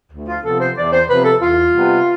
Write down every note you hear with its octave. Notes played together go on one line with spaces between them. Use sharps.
D2
F4
C3 F3 B3 A4
C5
E2 D5
C5
C3 F3 B3 B4
A4
E2 F4
C3 G3 B3